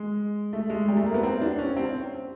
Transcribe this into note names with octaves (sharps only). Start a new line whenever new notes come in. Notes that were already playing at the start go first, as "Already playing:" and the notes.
Already playing: G#3
A3
G#3
G3
A3
A#3
B3
C4
D4
C#4
C4